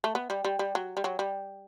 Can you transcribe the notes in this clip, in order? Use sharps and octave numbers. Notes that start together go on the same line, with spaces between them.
A3
B3
G3
G3
G3
F#3
G3
F#3
G3